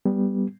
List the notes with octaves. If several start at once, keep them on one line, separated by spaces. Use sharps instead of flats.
G3 B3